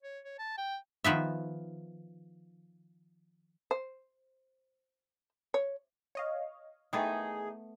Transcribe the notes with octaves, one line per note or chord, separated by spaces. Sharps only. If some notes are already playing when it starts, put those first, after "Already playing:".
C#5
C#5
A5
G5
D#3 F3 B3 E5
C5
C#5
C#5 D#5 F5
D#3 E3 A3 B3 D#4 G#4